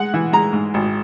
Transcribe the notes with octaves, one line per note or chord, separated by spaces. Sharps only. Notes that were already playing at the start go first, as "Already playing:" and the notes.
Already playing: G#3 F#5
E3
G#3 A#5
G#2
G#1